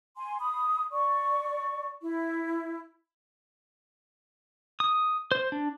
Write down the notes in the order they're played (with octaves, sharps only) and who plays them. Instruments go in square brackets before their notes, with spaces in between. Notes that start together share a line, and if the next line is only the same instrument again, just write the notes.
[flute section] G#5 C6
B5 D#6
D5 C#6
E4
[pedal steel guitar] D#6
C5
D4